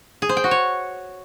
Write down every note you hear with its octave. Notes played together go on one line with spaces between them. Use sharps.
G#4
C5
G5
F#4
C#5